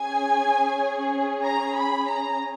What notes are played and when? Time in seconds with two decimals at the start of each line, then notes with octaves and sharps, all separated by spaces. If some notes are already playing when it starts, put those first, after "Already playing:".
Already playing: C#4 G#4 G#5
1.45 A#5
1.75 B5
2.07 A#5